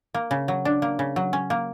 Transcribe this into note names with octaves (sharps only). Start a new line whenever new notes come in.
A#3
C#3
F#3
D4
A#3
C#3
F#3
C#4
A#3